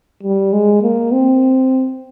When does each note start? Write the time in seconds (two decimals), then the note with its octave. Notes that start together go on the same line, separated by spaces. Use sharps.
0.23 G3
0.53 G#3
0.82 A#3
1.12 C4